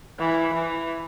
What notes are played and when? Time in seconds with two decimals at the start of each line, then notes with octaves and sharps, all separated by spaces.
0.19 E3
0.53 E3